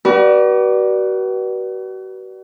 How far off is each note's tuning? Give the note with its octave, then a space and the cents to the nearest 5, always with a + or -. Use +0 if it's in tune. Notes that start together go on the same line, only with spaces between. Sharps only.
F#4 +40 B4 -30 D5 +10